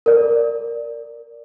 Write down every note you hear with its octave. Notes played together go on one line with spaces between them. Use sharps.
A#4 D5